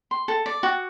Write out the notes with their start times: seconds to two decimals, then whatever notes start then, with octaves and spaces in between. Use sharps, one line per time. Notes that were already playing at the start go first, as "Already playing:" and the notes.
0.11 C6
0.28 A4
0.46 D5
0.63 F#4